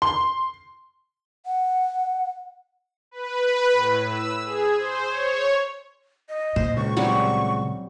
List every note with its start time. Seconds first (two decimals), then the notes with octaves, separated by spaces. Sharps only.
0.02 C6
1.45 F#5
3.11 B4
3.72 A2
4.05 E6
4.45 G#4
4.76 C5
5.09 C#5
6.29 D#5
6.56 A#2 C5
6.77 C#2 C#6
6.97 F#3 G3 C4 C#6